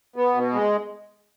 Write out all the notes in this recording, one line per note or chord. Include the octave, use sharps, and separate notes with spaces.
B3
B2
G#3